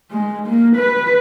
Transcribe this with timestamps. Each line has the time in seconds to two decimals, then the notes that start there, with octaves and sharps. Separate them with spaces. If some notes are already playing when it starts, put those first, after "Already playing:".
0.11 G#3
0.47 A#3
0.76 B4